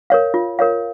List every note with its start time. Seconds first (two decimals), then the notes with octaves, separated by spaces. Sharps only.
0.10 A#4 C#5 F5
0.34 F4
0.59 A#4 C#5 F5